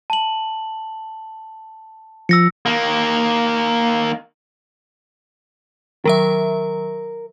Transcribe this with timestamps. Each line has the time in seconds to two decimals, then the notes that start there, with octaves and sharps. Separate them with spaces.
0.10 A5 F#7
2.29 F3 E6 A#6 C#7
2.66 D#3 A#3
6.05 D#3 F#3 A#4 E5